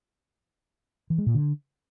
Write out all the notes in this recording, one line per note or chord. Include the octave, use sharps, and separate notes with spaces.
E3
G#3
A#2
D3